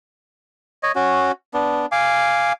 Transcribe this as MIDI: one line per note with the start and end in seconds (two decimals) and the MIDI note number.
0.83 0.92 73
0.83 0.92 75
0.95 1.32 61
0.95 1.32 66
1.54 1.86 59
1.54 1.86 62
1.92 2.52 77
1.92 2.52 80
1.92 2.52 86